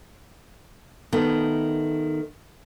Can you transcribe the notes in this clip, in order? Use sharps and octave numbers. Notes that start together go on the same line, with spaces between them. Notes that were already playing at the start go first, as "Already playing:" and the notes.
D#3 A3 B3